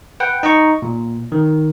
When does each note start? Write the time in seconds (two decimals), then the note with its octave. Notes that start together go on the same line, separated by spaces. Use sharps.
0.20 B4 F#5 G5
0.43 D#4 D#5 A#5 C#6
0.82 A#2
1.32 D#3